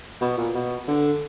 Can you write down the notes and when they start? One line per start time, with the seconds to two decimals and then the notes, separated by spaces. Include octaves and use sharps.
0.21 B2
0.37 A#2
0.54 B2
0.88 D3